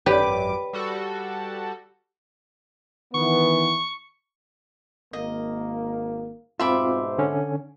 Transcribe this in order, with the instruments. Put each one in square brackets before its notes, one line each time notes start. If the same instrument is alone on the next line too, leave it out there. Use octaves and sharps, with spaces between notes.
[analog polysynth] G#1 F#2 D6 [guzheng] G4 [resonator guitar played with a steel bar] B4 [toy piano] C#5 D5
[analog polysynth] G3 F#4 A4
[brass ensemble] D#3 E3 B3 [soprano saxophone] C#6
[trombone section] G#1 A#3 [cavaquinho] D#5
[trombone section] G#2 B2 C5 [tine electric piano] C4 F4 [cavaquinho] E5 B5 D6
[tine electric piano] D3 C#4